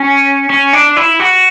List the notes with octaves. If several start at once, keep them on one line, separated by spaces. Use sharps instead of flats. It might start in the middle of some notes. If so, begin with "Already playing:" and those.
Already playing: C#4
C#4
D4
E4
F#4